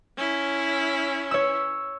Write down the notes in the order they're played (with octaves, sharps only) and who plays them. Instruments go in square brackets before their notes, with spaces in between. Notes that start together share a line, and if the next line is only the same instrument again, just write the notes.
[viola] C#4 E4
[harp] C#5 E6